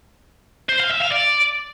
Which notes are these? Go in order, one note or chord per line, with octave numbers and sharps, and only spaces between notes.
C5
F5
E5
F5
D5